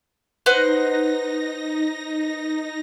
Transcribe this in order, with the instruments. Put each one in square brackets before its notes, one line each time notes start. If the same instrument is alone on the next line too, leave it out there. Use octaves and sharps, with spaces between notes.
[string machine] D#4 A#6 [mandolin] B4 C5 F#5